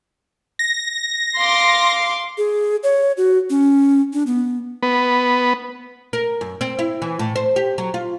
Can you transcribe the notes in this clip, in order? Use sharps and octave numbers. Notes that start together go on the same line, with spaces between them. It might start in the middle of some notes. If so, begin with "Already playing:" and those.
A#6
F5 C6 D6
G#4
C#5
F#4
C#4
D4
B3
B3
A#4
F#2
C4
E4
E3
A2
C5
G4
F#3
F4